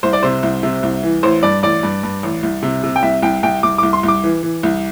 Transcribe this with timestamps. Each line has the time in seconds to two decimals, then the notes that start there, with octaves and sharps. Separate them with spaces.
0.03 C2 C5
0.13 D5
0.23 C3 C5
0.43 C2
0.63 C3
0.83 C2
1.03 E3
1.23 A1 C5
1.43 G2 D5
1.63 A1 D5
1.83 G2
2.03 G2
2.23 A1
2.43 C2
2.63 C3
2.83 C3
2.96 G5
3.03 C2 E5
3.23 C2 G5
3.43 C2 G5
3.63 C2 D6
3.78 C2 D6
3.93 C6
4.03 C2 D6
4.24 E3
4.43 E3
4.63 C2